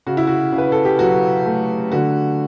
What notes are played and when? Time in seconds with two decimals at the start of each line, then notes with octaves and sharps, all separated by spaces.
0.07 C#3 F#4
0.17 E4
0.27 F#4
0.52 C#3
0.58 B4
0.72 A4
0.85 G4
0.99 F#3 F#4
1.46 A3
1.92 D3 F#4